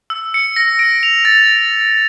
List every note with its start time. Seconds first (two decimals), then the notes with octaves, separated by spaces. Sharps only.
0.10 E6
0.34 C#7
0.56 A#6
0.79 D7
1.03 F7
1.25 A6